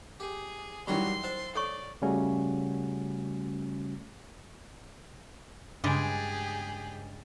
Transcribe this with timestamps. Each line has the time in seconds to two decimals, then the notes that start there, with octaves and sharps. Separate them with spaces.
0.20 G4 G#4
0.87 F#2 D#3 E3 G3 F#4 C#5 C6
1.24 C5 E5 A5
1.55 A4 C#5 D5 C#6
2.02 C#3 G3 A3 C#4 F#4
5.84 G2 C#3 G#3 D4 G4 G#4